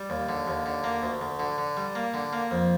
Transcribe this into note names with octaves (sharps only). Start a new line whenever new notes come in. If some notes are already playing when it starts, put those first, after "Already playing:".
Already playing: G3
D#2
D3
D#2
D3
A#3
D2
D2
D3
D3
G3
A#3
D3
A#3
F2